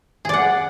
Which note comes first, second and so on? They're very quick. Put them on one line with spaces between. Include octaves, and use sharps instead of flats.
G#4 D5 F#5